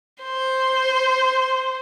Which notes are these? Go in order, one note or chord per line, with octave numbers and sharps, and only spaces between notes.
C5